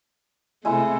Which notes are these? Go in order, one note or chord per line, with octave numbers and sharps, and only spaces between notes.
C3 G#3 A3 E4